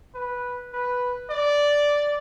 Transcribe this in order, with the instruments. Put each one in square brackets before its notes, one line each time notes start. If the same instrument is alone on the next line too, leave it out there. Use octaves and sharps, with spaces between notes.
[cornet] B4
B4
D5